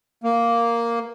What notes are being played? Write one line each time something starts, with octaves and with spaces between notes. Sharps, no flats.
A#3